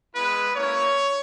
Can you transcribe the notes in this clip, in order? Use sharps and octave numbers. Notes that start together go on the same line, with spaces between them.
G#3 B3 E4 B4
A#3 C#4 E4 C#5